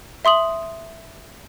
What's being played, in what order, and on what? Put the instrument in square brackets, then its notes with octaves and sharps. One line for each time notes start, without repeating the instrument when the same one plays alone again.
[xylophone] E5 C6 D#6 F#7